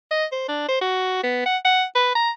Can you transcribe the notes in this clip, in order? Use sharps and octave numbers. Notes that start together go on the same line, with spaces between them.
D#5
C5
D4
C5
F#4
B3
F#5
F#5
B4
A#5